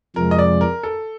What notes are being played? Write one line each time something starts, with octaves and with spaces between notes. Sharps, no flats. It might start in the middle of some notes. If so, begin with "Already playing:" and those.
F2 C3 F3 G#3 A#4
D#5
D5
A#4
A4